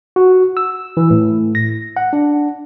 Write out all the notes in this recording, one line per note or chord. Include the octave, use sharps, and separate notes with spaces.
F#4
E6
E3
A2
A#6
F#5
D4